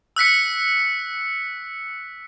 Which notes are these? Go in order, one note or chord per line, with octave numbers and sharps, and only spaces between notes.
E6 F#6 B6 C#7